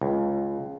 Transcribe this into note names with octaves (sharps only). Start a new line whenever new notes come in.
C#2